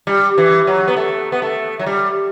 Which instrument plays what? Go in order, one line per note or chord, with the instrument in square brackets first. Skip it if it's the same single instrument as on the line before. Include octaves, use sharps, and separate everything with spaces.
[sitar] G3
E3
F#3
B3
A3
B3
A3
F#3
G3